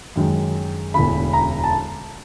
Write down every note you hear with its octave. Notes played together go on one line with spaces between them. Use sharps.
F#2 D#3 G#3
E1 D2 D3 B5
A#5
A5